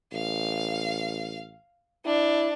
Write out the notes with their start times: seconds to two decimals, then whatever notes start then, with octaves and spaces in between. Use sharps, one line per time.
0.12 A1 F5
2.05 D4 E4